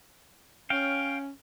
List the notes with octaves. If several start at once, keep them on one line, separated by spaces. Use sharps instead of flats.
C#4 F5 G5